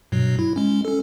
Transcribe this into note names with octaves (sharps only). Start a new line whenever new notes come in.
G2 B2 F#3
E4
G#3 C#4
C#4 A4